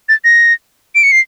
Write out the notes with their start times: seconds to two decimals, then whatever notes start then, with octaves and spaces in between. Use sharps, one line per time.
0.09 A6
0.24 A#6
0.95 D7
1.03 C#7
1.12 C7